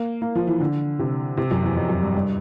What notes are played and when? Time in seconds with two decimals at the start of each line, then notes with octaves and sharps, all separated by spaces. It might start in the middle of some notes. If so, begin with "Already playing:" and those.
Already playing: A#3
0.22 A#3
0.35 F3
0.47 E3
0.60 D3
0.99 C3
1.37 C3
1.51 F#2
1.63 E2
1.76 F2
1.90 F#2
2.02 G2
2.15 G2